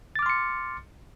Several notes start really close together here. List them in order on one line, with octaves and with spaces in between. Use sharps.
A6 D6 F6 C6 C#7